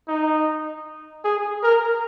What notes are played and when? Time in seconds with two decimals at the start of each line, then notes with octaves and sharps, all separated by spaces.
0.08 D#4
1.25 G#4
1.63 A#4